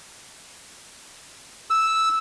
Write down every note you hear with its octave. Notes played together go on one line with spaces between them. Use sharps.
E6